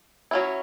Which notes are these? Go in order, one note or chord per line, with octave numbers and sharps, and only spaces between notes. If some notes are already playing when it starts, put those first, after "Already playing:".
F#3 C#4 E4